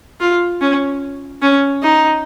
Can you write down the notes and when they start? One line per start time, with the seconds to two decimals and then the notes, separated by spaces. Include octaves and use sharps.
0.21 F4
0.61 C#4
1.42 C#4
1.83 D#4